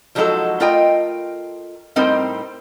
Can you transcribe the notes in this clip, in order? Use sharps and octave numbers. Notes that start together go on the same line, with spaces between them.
F3 F#3 G#3 D#4 F#4 A4
A3 F4 A#4 D#5 G5
A2 G3 C4 D#4 A#4 C5